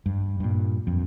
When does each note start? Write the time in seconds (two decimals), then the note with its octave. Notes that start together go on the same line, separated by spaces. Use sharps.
0.06 G2
0.40 G2 A#2
0.87 F2